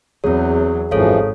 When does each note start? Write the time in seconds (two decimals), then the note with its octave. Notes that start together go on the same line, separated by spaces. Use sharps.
0.24 E2 F#3 C4 G#4 C#5
0.91 G#1 F#2 E3 F3 A4 C#5 F5